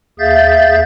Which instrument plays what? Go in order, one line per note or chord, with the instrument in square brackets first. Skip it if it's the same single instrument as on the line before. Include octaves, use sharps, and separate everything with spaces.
[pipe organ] D#2 G#4 E5 F5 G6 A6